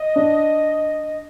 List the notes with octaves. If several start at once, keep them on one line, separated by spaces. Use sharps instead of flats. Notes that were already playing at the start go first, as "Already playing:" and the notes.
Already playing: D#5
D4